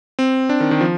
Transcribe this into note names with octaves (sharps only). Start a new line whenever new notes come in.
C4
D4
D#3
D#3
F3